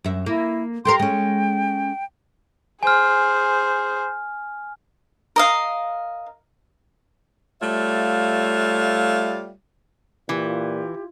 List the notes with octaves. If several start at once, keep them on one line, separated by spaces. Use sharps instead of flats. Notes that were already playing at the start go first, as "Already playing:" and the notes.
F#2 E5
A#3 E4
G4 A4 A#4 C6
G#3 C#4 G5
G#4 C5 G#5 F6
A#4 D#5 F5
G3 A3 F4 C#5 E5 F5
A#2 E3 F4 G4